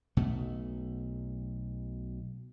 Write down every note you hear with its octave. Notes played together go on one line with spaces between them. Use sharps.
B1 B2 A3